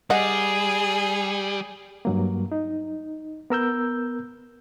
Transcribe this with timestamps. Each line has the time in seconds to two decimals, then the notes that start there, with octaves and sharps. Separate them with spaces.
0.10 G3 G#4 D#5 F#5
2.05 G2 F#3 A#3
2.52 D#4
3.50 B3 A#4 E6 G6